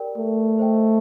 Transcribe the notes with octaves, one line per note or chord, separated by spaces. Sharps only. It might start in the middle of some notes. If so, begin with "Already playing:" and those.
Already playing: G4 A#4 D5 G5
A3
C5 D#5 G5